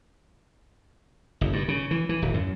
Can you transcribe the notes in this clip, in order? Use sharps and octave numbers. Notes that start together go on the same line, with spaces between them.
F#1
G2
C#3
E3
E3
D1
F#2